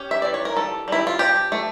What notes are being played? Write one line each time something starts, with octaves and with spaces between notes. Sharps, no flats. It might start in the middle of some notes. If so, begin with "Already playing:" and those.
Already playing: C#4 G4
E5
E3 D5
C#5
A#4
G3 A4
G3 E4
F4
F3 G4
A3